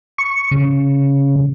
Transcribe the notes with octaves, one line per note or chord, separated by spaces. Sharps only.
C#6
C#3